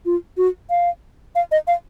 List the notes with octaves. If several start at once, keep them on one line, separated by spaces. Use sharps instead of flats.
F4
F#4
F5
F5
D#5
F5